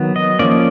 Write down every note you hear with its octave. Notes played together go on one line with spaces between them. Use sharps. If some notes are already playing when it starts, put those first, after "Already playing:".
Already playing: D#3 F#3 B3
D#5
F3 A#3 C#4 D5